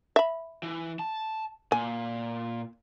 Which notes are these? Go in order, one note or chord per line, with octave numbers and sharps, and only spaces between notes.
E5 B5
E3
A5
A#2 G#5